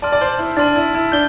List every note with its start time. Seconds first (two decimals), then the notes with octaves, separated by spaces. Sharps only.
0.02 D5 A5 C6 F6
0.12 D5
0.21 C5
0.39 E4
0.57 D4 A5 C6 F6 A6
0.76 E4
0.95 E4
1.12 D4 G6 G7